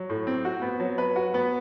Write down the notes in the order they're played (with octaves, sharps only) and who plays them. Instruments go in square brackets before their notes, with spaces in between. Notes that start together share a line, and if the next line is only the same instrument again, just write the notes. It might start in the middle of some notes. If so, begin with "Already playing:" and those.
Already playing: [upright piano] F#3
A2
C4
F#4
B3
F#3
B4
F#4
B3